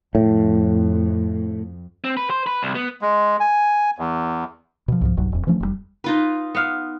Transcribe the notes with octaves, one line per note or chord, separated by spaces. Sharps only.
F2 A2
C4
B4
C5
B4
C2
B3
G#3
G#5
E2
B2 F3
C2 G#2 F3
F1 B1 G2 F#3
E1 F2
E3 F3 A3 C#4
F1 A2 G3
D#4 F4 B4
B3 F5